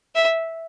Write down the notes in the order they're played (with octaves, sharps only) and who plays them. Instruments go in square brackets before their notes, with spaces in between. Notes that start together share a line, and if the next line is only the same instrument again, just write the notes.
[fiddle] E5